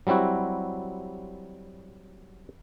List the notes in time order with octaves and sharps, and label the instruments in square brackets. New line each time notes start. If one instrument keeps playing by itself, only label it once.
[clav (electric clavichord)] F#3 G3 C4 E4 F#4